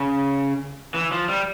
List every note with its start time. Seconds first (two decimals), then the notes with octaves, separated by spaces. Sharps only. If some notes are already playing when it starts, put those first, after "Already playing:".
Already playing: C#3
0.94 E3
1.12 F3
1.29 G3